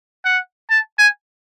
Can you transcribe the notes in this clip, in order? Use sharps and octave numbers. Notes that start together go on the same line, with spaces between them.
F#5
A5
G#5